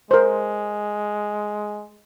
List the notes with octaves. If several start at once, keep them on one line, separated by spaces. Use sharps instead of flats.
G#3 A#4 C5